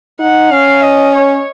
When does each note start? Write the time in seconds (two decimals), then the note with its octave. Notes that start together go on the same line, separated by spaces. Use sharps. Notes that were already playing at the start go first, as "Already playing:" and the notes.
0.19 D#4 F#5
0.51 C#4 F5
0.82 D#5
1.15 C#5